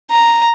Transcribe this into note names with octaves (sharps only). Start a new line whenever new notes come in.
A#5